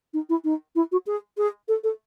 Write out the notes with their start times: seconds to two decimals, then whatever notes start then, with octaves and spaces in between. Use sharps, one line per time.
0.13 D#4
0.29 E4
0.44 D#4
0.75 E4
0.92 F#4
1.06 G#4
1.37 G#4
1.68 A4
1.83 A4